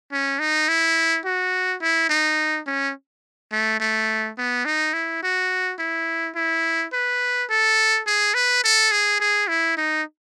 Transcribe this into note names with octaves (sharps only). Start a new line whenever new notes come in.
C#4
D#4
E4
F#4
E4
D#4
C#4
A3
A3
B3
D#4
E4
F#4
E4
E4
B4
A4
G#4
B4
A4
G#4
G#4
E4
D#4